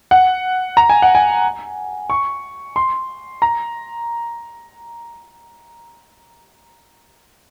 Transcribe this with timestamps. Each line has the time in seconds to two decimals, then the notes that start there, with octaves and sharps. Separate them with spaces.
0.11 F#5
0.77 A#5
0.90 G#5
1.02 F#5
1.15 G#5
2.10 C#6
2.76 C6
3.42 A#5